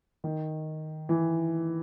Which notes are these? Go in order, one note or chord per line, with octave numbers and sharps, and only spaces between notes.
D#3
E3